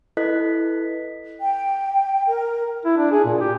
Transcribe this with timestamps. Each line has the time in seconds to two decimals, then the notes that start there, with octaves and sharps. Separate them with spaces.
0.17 E4 A4 B4 D#5 F#6 B6
1.40 G5
2.27 A#4
2.85 E4
2.97 D4
3.12 G#4
3.25 A#2
3.41 G4